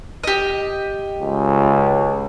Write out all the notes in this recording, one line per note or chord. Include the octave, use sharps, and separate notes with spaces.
G4 D#5
C#2